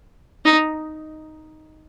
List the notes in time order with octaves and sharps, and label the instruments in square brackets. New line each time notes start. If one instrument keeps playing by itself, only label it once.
[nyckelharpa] D#4